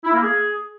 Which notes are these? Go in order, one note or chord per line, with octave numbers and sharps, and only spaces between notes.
E4
A#3
G#4